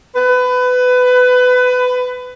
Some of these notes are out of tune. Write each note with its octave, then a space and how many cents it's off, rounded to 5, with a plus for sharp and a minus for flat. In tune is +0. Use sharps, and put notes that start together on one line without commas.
B4 +20